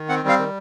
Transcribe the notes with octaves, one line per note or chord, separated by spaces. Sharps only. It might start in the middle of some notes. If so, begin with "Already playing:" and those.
Already playing: D#3
C4 F#5
G3
F5
D#3